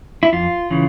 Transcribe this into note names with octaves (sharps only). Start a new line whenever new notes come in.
E4
F2 F4
C#3 E3